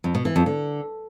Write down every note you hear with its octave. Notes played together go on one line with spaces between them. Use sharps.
F2
B2
E3
F2
D3